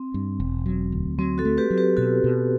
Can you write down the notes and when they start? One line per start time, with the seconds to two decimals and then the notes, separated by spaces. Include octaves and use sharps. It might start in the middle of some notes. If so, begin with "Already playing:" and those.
Already playing: C4
0.14 G2
0.40 E1
0.66 F#3
0.92 D2
1.18 F#3 C4
1.38 F#4 A4
1.45 A3
1.57 G4 B4
1.70 F#3
1.78 G4 B4
1.97 B2 F#4 A4
2.24 B2